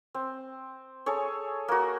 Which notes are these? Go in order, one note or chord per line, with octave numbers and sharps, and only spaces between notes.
C4
G#4 A4 C#5
A#3 F#4